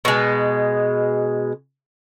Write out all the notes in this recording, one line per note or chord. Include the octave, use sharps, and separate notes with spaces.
B2 G#3